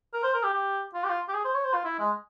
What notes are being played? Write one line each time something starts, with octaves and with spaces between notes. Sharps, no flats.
A#4
C5
A#4
G4
G4
F4
G4
F4
G4
G#4
C5
C#5
C5
F4
E4
G#3